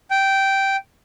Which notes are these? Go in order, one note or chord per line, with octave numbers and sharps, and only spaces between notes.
G5